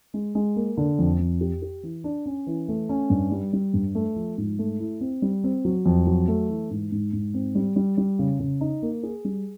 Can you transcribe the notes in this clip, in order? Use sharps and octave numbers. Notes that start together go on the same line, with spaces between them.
G#3
G#3
A#3
D3
F2
F2
G4
G4
E3
D4
C#4
E3
A3
C#4
G2
G3
G3
G2
A3
F3
G#2
A3
E4
C4
G3
C4
F#3
F2
F#3
A3
E3
G#2
G#2
G#2
C4
G3
G3
G3
C#3
C#3
D#4
A#3
G#4
G3